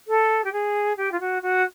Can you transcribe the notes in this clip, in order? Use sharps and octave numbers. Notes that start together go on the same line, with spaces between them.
A4
G4
G#4
G4
F4
F#4
F#4